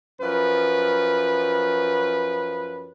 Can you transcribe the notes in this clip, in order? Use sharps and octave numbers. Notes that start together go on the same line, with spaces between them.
F#2 F3 B4